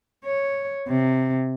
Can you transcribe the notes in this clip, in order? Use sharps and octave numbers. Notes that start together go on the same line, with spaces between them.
C#5
C3